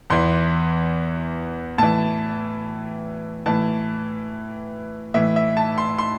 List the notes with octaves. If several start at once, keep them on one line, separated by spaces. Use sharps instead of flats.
E2 E3 C6
A2 E3 A5
A2 E3 A5
A2 E3 E5
E5
A5
C6
C6